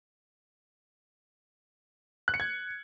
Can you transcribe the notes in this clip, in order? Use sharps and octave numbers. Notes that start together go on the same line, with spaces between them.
F#6
C#7
G#6